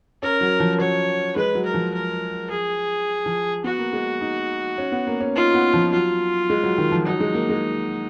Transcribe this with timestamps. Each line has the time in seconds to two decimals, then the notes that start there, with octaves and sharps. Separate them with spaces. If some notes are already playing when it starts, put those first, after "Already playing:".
0.22 C#4 A#4
0.41 F#3
0.60 F3
0.79 F#3 C#5
1.36 G#3 B4
1.55 F#3
1.65 A#4
1.74 F3
1.93 A#4
2.50 G#4
3.26 F3
3.64 B3 F#4
3.78 A#3
3.93 G#3
4.21 D#4
4.78 C#4
4.92 B3
5.07 A#3
5.21 C#4
5.35 D#4 F4
5.54 B3
5.74 F3
5.92 F#3 F4
6.50 G#3
6.64 F#3
6.78 D#3
6.92 F3
7.06 F#3 D#4
7.20 G#3
7.34 A#3
7.49 G#3